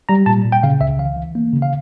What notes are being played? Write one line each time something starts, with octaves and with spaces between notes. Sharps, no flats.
G3 A#5
A#2 A5
A#2
G5
C#3 F5
C#2 E5
E3 F5
E3
A#3
C#3
F5